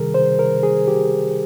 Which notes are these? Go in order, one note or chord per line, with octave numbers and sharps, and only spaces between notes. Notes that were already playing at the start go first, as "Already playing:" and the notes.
Already playing: C3 D#3 G3 G#4 A#4
C5
A#4
G#4
G4